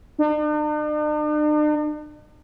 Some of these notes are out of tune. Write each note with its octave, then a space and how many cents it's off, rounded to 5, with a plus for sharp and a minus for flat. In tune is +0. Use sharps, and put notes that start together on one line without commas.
D4 +45